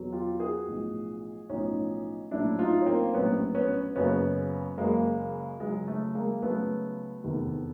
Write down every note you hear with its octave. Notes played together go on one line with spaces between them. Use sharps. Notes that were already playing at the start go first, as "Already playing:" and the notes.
Already playing: E2 B2 F#3
F4 G4
F#4 G#4
B1 A2 F3
B1 A2 F3 C#4 D#4
A#1 A2 F#3 D4 E4
D#4 F4
C#4
A#3 C4
A#1 A2 F#3 B3 C#4
B3 C#4
F#1 F#2 C#3 B3 C#4
F#1 F#2 C#3 G#3 A#3
C#2 C#3 F#3 G#3
A3
G#3 A#3
C#2 C#3 F#3 A3 B3
F1 E2 C3 D#3